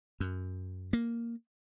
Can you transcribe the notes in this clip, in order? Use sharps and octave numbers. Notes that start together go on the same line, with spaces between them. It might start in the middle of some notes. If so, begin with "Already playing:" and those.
F#2
A#3